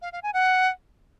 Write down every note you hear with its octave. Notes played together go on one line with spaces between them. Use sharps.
F5
F5
G#5
F#5